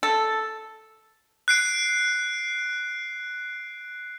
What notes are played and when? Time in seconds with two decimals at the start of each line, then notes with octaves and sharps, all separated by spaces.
0.03 A4
1.48 F#6 C7 D7